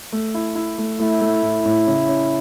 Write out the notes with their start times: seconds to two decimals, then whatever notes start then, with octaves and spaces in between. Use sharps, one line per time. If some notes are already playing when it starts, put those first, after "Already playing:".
0.13 A3
0.35 E4
0.55 E4
0.78 A3
0.99 A3 E4
1.21 A3
1.42 A2
1.66 A2
1.87 C#3
2.09 C#4